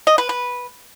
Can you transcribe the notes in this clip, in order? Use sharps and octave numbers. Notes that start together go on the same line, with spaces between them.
D#5
B4
B4